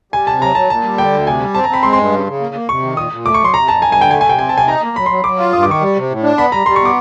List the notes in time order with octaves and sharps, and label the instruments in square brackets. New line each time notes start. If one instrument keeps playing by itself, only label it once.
[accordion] G3 [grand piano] G#5
[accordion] C3 [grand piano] A5
[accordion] F#3 [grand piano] A#5
[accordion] F#3 [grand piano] A5
[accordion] A#2 [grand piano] A5
[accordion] G3
[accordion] D3 [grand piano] G5
[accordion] D2
[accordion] C3 [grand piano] G#5
[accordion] G3
[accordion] C4 [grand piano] A5
[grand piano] A#5
[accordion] C4 [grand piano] B5
[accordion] G#3 [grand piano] C6
[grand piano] C6
[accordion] G2
C#3
C#3
A#3
A#3
[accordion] C3 [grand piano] C#6
[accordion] D#3
[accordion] A#2 [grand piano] D#6
[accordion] A#2
[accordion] A3 [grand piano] D6
[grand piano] C#6
[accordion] F#3 [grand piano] C6
[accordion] C3 [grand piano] A#5
[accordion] F2 [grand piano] A5
[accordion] G2 [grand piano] G#5
[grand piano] G#5
[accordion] D3 [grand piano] G5
[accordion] A3 [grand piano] G#5
[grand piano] G#5
[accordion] C3 [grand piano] G5
[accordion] C4 [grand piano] G#5
[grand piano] A5
[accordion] C3 [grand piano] G#5
[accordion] D#4 [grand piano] A#5
[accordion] A#3
[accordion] F#3 [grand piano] B5
[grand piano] C6
[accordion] F#3
[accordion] F#3 [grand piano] D6
[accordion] F4
[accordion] G2 [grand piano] D#6
[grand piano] D6
[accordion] D#3 [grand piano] C#6
[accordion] G3
C3
A2
D4
[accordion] B3 [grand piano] B5
[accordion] G3 [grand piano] A#5
[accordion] G3 [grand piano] C6
[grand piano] C#6
[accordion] B3 [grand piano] D6